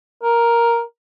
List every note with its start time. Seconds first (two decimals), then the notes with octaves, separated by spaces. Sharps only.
0.23 A#4